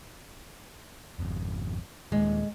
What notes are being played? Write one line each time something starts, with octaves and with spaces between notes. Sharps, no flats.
G#1 F2
D#2 A#2 D#3 G#3